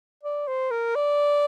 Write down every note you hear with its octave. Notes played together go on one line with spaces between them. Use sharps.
D5
C5
A#4
D5